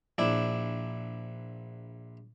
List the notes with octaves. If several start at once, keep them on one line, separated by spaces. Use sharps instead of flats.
A#1 D4 E4